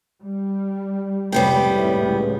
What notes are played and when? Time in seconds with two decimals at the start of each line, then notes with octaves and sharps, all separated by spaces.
0.21 G3
1.32 F1 C#2 G3 B3 G5
1.71 G#1 A2
2.02 C#2